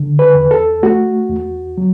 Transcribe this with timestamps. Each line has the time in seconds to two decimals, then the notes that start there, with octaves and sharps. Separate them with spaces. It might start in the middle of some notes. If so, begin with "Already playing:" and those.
Already playing: D3
0.19 B4
0.35 E2
0.51 A4
0.83 A3 F#4
1.29 E2
1.78 F#3